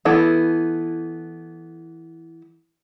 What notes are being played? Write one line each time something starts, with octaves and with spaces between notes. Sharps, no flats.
E3 B3 A4